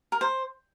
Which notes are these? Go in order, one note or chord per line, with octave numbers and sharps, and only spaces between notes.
A#4
C5